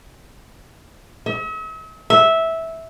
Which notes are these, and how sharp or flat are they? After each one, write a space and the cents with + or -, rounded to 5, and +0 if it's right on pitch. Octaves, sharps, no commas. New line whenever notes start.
E5 -45
E5 -10